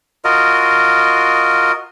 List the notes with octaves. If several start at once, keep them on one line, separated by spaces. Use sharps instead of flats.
F4 F#4 A#4 D#5